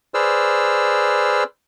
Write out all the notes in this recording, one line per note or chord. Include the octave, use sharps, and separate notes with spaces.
G#4 B4 C5 D5 E6 F6